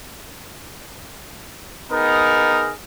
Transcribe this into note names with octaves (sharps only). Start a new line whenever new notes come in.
B3 D#4 G#4 A#4